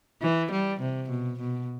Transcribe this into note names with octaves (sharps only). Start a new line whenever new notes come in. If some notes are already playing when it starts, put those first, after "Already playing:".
E3
G3
C3
B2
B2